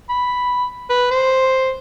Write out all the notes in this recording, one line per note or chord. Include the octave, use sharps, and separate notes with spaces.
B5
B4
C5